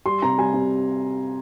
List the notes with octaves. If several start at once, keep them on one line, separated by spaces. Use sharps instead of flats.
G3 C6
C3 A#5
G3 G#5
C3